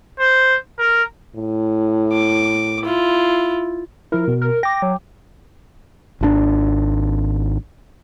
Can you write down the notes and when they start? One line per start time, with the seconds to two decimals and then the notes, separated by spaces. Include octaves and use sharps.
0.20 C5
0.79 A#4
1.35 A2
2.13 D6
2.82 E4 F4
4.12 F3 E4 A#4
4.28 B2
4.42 A#4
4.63 G5 D6 A#6
4.82 F#3
6.21 G#1 D#3 D4